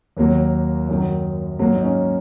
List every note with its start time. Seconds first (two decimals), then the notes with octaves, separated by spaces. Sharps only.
0.17 D#2 D#3 F#3 A#3
0.88 F#2 D#3 F#3
1.59 G#2 F#3 A#3
1.76 D#4
1.84 C#4